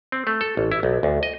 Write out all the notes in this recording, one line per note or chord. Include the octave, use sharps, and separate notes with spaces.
C4
A3
A4
A1
E4
B1
D2
D#5